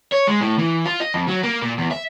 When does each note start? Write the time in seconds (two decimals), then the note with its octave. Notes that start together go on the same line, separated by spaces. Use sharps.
0.12 C#5
0.28 G#3
0.41 A2
0.58 E3
0.86 F4
1.00 D#5
1.14 F2
1.28 F#3
1.43 A#3
1.62 A#2
1.78 E2
1.91 E5